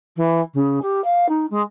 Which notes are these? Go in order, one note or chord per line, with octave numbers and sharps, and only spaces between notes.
E3
C#3
G4
F5
D#4
G#3